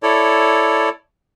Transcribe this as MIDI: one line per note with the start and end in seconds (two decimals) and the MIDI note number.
0.03 0.89 64
0.03 0.89 69
0.03 0.89 73
0.03 0.89 74